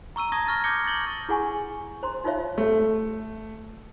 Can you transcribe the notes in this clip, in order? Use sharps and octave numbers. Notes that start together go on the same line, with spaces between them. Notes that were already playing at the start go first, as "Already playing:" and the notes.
A#5 C#6 E6 D#7
A5 C#6 D#6 G#6 A#6
C#6 F6 A6 A#6
D6 G6 G#6 A#6 C#7 G7
C#6 G6 A6 F#7 G7
E4 G#4 F#5 G#5 C#6
C5 A#5 C6
D#4 F4 C5 C#5 E5 F5
A3